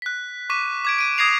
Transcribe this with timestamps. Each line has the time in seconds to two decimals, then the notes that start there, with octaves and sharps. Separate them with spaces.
0.02 F#6 B6
0.50 C#6 D6 B6 D#7
0.85 D6 G#6 D7
0.99 D7 D#7
1.18 D6 D#6 G#6 A#6 C7 F7